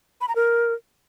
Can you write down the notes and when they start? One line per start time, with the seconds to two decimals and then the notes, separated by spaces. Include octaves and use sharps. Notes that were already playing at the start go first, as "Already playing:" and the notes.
0.21 B5
0.28 A#5
0.36 A#4